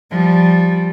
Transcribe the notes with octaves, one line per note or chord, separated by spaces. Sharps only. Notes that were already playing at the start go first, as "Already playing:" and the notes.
F3 G3